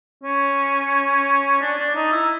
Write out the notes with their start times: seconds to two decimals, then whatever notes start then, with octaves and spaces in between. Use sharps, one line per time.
0.23 C#4
1.61 D4
1.78 D4
1.95 D#4
2.12 E4